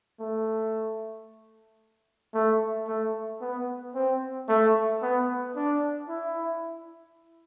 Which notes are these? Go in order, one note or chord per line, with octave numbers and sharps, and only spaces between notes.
A3
A3
A3
B3
C4
A3
B3
D4
E4